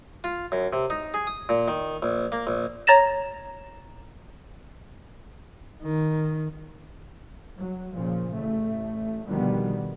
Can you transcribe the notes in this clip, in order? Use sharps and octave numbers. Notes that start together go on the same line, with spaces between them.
F4
F#2
C3
D#4
G#4
D#6
A#2
D#3
A#1
A#3
A#1
C#5 A#5 A6 A#6 E7
D#3
F#3
A#2 C#3 F3
A1 A3
B2 D3 D#3 F3 G3 B3